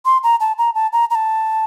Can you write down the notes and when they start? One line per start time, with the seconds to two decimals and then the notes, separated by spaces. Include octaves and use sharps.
0.05 C6
0.23 A#5
0.40 A5
0.58 A#5
0.75 A5
0.93 A#5
1.10 A#5
1.15 A5